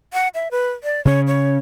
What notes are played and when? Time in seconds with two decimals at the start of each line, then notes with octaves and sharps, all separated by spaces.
0.13 F#5
0.34 E5
0.51 B4
0.84 D5
1.05 C#3 C#4 C#5
1.27 C#5